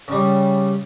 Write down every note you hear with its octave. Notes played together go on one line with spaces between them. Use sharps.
C#3 G3